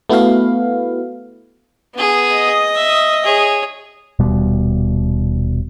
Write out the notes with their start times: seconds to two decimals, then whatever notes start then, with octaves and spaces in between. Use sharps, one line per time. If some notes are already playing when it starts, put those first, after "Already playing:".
0.10 A3 B3 E4 F#4 B4 F5
1.95 B3 G#4
2.32 D#5 D#6
2.75 E5
3.24 G#4 C#5
4.19 D#1 B2 G3